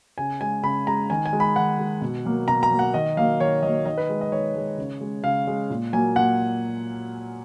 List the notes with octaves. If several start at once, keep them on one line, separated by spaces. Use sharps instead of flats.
C#3 G#5
G#3 G#5
C#3 B5
G#3 A#5
D#3 G#5
G#5
G#3
B5
D#3 F#5
G#3
B2
F#3 A#3
B2 A#5
A#5
F#3 A#3
F#5
D#3 D#5
F#3 A#3 F5
D#3 C#5
F#3 A#3 D#5
D#3 D#5
B4
G#3
D#5
D#3 C#5
G#3
C#3
G#3
C#3 F5
G#3
A#2
F#3 A#3 G#5
A#2 F#5